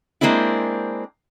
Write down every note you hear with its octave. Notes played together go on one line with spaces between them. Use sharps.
G#3 A#3 C4 D4 E4